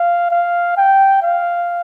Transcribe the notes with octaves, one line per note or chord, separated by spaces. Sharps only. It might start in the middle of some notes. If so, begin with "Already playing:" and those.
Already playing: F5
F5
G5
F5